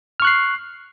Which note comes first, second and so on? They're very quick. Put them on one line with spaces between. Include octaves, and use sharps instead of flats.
F6 C#6 F#6 C7